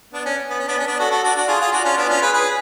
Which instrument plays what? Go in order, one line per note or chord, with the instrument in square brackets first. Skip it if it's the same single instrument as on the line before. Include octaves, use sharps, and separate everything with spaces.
[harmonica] B3 D4
C#4
B3
C#4
B3 D4
C#4
B3 D4
F#4 A4
F#4 A4
D4 F#4
D4 F#4
F4 G#4
F4 G#4
D4 F#4
C#4 F4
B3 D4
C#4 F4
G#4 B4
G#4 B4